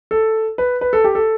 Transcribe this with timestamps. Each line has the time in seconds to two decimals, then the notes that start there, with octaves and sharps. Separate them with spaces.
0.11 A4
0.58 B4
0.81 B4
0.93 A4
1.04 G4
1.15 A4